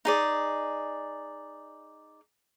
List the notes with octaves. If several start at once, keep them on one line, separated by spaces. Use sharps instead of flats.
D#4 G#4 D5